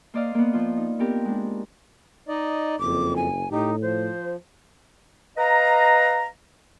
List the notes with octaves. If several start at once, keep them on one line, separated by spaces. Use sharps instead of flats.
A#3 C5 D5 D#5 F5
A#3 B3
F3 F4
D#4
B3 C4 G4 A#4
G#3 D4
D#4 D5 D#5
F#1 F2 D6
G#5
A2 D#4 G4
F3 C5
B4 D#5 F5 A#5